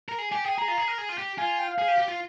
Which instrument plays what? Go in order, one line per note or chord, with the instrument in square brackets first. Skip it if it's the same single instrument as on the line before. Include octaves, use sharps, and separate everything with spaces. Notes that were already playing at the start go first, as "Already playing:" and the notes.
[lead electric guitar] A#4
G#4
[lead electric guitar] G4 [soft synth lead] G#5
[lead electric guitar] G#4 [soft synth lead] G5
[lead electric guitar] G#4 [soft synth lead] A#5
[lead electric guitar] F4
G#4
A#4
G#4
F4
G4
[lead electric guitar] F4 [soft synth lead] G#5
[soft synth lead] G#5
G5
F5
[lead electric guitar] G#4
G4
G4
F4